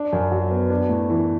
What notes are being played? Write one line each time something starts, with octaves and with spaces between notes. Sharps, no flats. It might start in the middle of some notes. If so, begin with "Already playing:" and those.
Already playing: D4
F#2
F#3
B3
D4
A2
E3